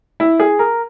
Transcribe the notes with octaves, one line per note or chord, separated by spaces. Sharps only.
E4
G#4
A#4